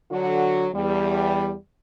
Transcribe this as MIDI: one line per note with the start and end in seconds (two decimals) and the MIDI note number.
0.12 0.68 50
0.12 0.68 54
0.12 0.68 66
0.74 1.53 40
0.74 1.53 55